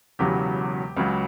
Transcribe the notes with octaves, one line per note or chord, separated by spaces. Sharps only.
E1 E2 C#3 F#3 G4
C#2 C#3 F#3